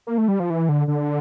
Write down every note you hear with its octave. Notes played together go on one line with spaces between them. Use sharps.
A#3
A3
G3
F3
E3
D3
D3